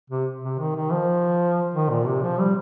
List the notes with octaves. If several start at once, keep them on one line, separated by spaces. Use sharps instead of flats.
C3
C3
D#3
D#3
F3
D#3
A#2
C3
F3
G3